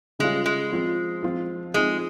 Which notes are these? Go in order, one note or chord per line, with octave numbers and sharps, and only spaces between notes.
C#3 G3 G#3 C#4 F4
G#3
F3 C4 F4
F3 C4 F4
F3 G#3 C4 D#4